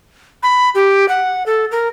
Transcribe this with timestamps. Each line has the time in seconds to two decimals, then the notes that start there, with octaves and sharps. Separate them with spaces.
0.43 B5
0.75 G4
1.09 F#5
1.46 A4
1.71 A#4